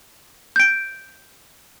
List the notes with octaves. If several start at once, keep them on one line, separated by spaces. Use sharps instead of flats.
G6 D7